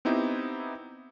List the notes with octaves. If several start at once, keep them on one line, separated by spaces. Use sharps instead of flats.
B3 C4 D#4 E4 G4